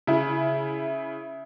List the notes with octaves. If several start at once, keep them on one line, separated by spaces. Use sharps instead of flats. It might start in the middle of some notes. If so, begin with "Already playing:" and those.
C#3 E4